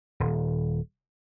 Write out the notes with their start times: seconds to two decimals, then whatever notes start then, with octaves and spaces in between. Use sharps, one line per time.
0.20 D#1